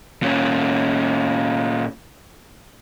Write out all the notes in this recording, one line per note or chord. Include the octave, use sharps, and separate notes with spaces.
A#2 C#4